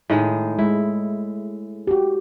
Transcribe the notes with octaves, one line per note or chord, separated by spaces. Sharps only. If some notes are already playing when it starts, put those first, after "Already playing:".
A2 D#3 G#3
G#3 E4
F#4 G4